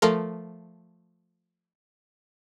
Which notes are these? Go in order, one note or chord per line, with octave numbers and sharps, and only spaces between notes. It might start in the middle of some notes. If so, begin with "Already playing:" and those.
F3 A3 F4 A4 A#4